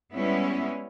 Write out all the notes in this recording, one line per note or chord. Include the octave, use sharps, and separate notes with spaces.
G3 G#3 B3 C#4 E4